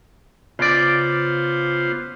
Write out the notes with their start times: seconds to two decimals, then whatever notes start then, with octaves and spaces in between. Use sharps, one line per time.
0.59 C#3 B3 F4 C5 D5